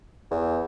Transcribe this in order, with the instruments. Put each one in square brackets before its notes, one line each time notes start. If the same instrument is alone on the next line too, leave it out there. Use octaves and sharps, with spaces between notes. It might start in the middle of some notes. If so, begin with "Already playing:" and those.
[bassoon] E2